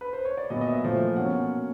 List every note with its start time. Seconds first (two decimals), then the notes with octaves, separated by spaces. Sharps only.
0.01 B4
0.13 C5
0.25 C#5
0.37 D5
0.50 A#2 F#3 B3 D#5
0.61 D#5
0.67 E5
0.83 A#2 F3 A3
1.16 B2 F#3 A#3 C#4 F#5